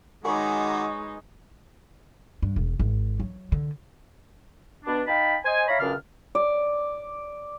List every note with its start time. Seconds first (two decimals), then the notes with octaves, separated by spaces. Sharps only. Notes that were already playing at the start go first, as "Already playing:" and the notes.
0.25 D#3 G#3 D#4 F#4 B4 C#5 G#5 D6
2.42 G2
2.56 E1
2.80 G#1
3.20 F#3
3.52 D3
4.85 B2 D4
5.08 D#4 F5 G5 A5 B5
5.45 C5 D#5 G#5
5.68 C#5 E5 F5 A#5 B5
5.80 C#2 F#2 C#3 D4 F6
6.35 D5